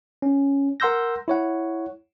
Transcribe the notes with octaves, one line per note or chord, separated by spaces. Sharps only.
C#4
A#4 F#5 C6 E6 G6 A#6
E4 C#5 F#5